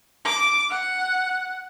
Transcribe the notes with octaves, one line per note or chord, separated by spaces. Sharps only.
D6
F#5